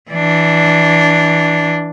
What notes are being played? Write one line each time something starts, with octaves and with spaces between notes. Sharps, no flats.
E3 D4